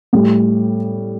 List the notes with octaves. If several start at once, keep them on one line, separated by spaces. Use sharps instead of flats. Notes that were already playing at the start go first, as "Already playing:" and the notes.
A2 G3